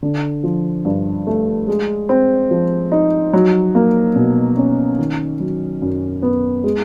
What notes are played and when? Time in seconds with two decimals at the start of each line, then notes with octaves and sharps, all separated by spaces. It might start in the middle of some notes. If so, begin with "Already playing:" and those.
0.03 D3
0.44 F3
0.85 G2
1.27 A3
1.68 G#3
2.09 C4
2.51 F3
2.92 D#4
3.33 F#3
3.75 A#3
4.15 B2
4.57 C#4
4.99 D#3
5.40 F#3
5.82 F#2
6.22 B3
6.64 G#3